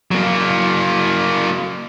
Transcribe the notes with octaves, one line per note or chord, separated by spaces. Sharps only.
F#3 A#3